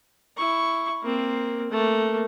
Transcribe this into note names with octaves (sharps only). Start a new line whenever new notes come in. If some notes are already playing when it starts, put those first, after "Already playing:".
E4 C#6
A#3 C4
A3 A#3